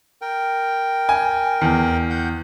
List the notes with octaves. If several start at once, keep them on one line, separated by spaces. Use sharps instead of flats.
A#4 G5
G#5
E2
F#5 G6